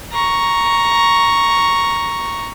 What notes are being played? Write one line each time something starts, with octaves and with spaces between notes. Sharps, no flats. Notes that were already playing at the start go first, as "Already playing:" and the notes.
A#5 C#6